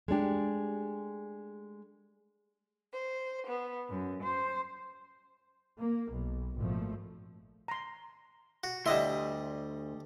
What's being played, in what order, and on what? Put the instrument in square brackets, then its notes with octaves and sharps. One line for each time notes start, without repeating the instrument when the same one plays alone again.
[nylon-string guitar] G#3 A3 D4 G4
[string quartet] C5
B3
F#2
C5
[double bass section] A#3
B1
G#1 A#2 F3 A3
[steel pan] A#5 C6
[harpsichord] F#4
[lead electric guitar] D2 [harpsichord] G3 D#5 C6 [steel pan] E4 E5 F#5